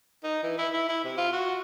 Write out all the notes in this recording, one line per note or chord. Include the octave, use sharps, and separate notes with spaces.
D#4
E3
E4
E4
E4
C3
F4
F#4